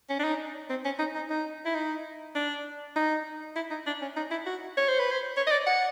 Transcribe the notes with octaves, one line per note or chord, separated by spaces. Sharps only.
C#4
D4
D#4
C4
C#4
D#4
D#4
D#4
E4
D#4
D4
D#4
E4
D#4
D4
C#4
D#4
E4
F#4
C#5
C5
B4
C5
C#5
D#5
D5
F#5